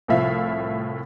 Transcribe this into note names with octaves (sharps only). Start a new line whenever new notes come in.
C2 A2 F3 E5 F5